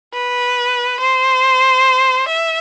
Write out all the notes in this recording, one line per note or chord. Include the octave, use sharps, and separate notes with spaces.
B4
C5
E5